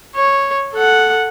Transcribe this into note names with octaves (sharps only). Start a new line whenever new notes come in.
C#5
A4 F#5